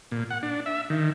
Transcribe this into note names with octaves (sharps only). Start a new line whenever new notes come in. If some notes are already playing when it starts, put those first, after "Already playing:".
A#2
F#5
D4
E5
D#3